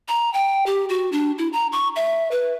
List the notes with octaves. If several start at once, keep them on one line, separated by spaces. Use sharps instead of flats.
A#5
G5
G4
F#4
D4
E4
A#5
C#6
E5
B4